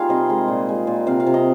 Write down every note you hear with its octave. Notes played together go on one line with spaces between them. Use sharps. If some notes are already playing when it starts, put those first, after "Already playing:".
Already playing: G3 A#3 D#4 F4 G#4 F5
C3 D#5
G#3
A#2
G#3
A#2
C3 F5
F5
C3
D#5